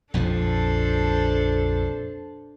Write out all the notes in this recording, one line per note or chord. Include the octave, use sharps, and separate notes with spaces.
A#1 F2 F3 D4 A4 C5